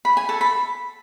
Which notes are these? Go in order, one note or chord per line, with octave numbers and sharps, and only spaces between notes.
B5
G#5
A4
B5